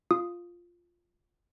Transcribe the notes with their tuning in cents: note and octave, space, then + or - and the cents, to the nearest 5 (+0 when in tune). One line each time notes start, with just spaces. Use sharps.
F4 +0 D#6 +0